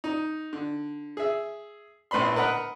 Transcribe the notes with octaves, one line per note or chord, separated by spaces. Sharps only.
D#4
D3
G#4 E5
A#1 A2 B3 B5 C6
A#4 B4 D#5 F#5 B5